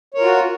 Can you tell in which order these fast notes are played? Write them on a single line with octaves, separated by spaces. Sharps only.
C#5 A#4 F4 F#4